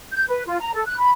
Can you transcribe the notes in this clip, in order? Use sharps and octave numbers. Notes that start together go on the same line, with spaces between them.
G6
B4
F4
A#5
A4
F#6
B5